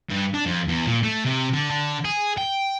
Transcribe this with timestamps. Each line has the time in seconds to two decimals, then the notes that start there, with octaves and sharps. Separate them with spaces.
0.10 G2
0.34 D4
0.46 F2
0.68 E2
0.87 A#2
1.03 A3
1.25 C3
1.53 D3
1.71 D3
2.05 G#4
2.38 G5